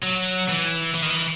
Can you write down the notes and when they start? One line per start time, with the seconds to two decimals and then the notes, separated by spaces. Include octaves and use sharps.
0.03 F#3
0.49 E3
0.95 E3
1.02 D#3
1.10 E3